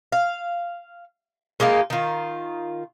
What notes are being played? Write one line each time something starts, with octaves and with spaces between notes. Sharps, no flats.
F5
G#3 A#3 D#4 F4
D#3 F4